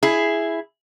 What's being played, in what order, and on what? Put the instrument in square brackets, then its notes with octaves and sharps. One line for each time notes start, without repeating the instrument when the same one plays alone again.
[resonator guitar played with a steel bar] E4 G#4